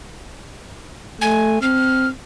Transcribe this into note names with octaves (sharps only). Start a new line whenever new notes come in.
A3 G#5
C4 F6